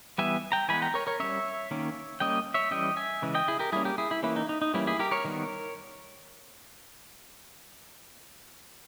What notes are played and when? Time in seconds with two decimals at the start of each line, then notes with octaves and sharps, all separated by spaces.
0.18 E3 G3 B3 E5 G#5
0.52 G5 A#5
0.69 E3 G#3 B3 G#5 B5
0.82 G5 A#5
0.94 A#4 C#5
1.07 A#4 C#5
1.20 G3 C#4 C#5 E5
1.71 D#3 A#3 C#4
2.20 G3 A#3 C#4 D#5 G5
2.54 C#5 E5
2.71 E3 G3 C#4 D#5 G5
2.96 E5 G#5
3.22 C#3 E3 G#3
3.35 D#5 G5
3.48 E4 G#4
3.59 G4 A#4
3.72 G3 A#3 C#4 E4 G#4
3.85 G4 A#4
3.98 E4 G#4
4.11 E4
4.23 E3 A#3 C#4 E4
4.36 D#4
4.49 D#4
4.62 D#4
4.74 E3 G3 A#3 C#4 E4
4.87 E4 G#4
4.99 G4 A#4
5.11 A#4 C#5
5.25 D#3 G3 B3